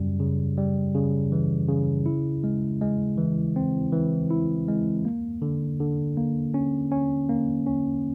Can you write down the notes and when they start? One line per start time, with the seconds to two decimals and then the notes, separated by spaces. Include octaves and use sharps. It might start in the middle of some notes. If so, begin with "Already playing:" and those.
Already playing: F#2 C#3 G3
0.20 C#3
0.57 G3
0.95 C#3
1.32 E3
1.68 C#3
2.06 E4
2.44 G#3
2.81 G#3
3.18 E3
3.56 C4
3.92 E3
4.30 E4
4.68 G#3
5.05 A#3
5.42 D3
5.80 D3
6.17 A#3
6.54 C#4
6.92 C#4
7.29 A#3
7.67 C#4